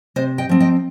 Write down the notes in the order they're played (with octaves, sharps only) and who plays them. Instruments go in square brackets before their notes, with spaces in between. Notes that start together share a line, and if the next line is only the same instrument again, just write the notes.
[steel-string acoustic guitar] C3 C5 D#5
D#5 G5
F3 C4
D#5 G5